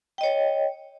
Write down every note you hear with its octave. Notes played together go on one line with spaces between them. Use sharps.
C#5 D#5 G5